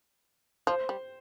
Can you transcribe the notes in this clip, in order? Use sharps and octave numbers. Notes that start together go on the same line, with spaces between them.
F3 C5
G3